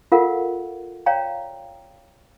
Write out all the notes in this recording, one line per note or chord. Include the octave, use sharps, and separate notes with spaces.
F4 A4 A#4 F5 F#5
C#5 D5 F5 G5 A#5